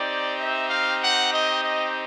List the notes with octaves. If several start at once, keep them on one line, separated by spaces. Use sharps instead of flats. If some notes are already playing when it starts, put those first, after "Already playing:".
Already playing: C4 D#4 G4 D5
E5
F5
F#5
D#5
D#5